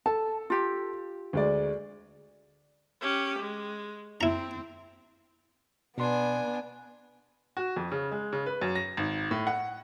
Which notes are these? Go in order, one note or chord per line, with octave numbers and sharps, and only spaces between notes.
A4 A5
F4 G4
D2 G#3 D5
C#4 G4
G#3
C4 E4 A#5
B2 B3 D4 G#5 C6
F#4
F2
C#3
G#3
C#3
B4
F#2
A#6
G#1
A2
F#5